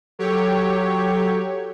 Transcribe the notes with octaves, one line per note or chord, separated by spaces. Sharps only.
F#3 G4 A4 C#5